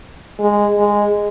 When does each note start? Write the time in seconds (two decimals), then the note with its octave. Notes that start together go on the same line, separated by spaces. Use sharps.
0.39 G#3
0.78 G#3